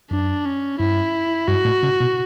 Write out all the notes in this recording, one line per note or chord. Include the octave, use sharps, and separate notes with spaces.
F#2 D4
C#4
G2 E4
G2 F#4
A2
C#3
B2